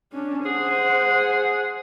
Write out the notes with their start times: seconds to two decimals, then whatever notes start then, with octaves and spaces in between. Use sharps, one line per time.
0.13 C#4 D4
0.46 G#4 C5 F#5